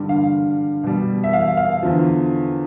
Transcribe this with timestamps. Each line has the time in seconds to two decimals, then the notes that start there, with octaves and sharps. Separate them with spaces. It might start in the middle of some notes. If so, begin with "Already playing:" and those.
Already playing: G2 D3 G3
0.09 F5
0.83 B2 G3
1.24 E5
1.33 F5
1.57 F5
1.83 E2 D3 F3